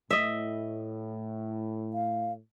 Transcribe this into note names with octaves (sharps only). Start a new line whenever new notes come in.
A2 D#5 E5
F5